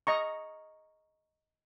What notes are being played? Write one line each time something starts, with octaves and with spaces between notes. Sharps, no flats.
D#5 A#5 C#6